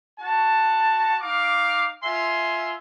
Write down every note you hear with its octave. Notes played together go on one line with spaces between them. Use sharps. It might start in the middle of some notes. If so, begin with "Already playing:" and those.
F#4 A5
D#4 F5 D6
F4 E5 G#5 C6